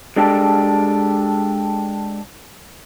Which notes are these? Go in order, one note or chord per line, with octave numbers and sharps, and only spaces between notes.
G#3 D4 G4 A4